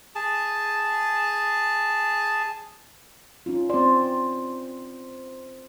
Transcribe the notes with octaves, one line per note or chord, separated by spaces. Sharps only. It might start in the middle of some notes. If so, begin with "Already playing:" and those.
G#4 A5
C#4 D#4 F4
C4 C5 D5